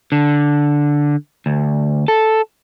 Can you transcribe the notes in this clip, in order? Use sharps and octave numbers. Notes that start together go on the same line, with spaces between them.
D3
D2
A4